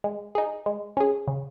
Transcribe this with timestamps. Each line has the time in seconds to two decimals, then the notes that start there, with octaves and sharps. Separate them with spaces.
0.04 G#3
0.35 D#4 G#4
0.66 G#3
0.97 C#4 G#4
1.27 C#3